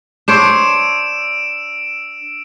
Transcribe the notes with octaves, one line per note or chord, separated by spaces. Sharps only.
D4 C5 C#5 E6 D7 E7